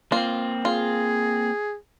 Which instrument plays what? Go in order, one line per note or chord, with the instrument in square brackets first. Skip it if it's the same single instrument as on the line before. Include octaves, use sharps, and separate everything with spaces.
[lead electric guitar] A#3 C4 [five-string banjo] F4
[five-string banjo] F4 [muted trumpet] G#4